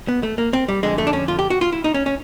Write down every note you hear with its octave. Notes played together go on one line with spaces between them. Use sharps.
B3
A3
A#3
C4
G3
F2 D3 G#3
A3
D4
C#4
F4
G4
F#4
F4
E4
D#4
C#4
C#4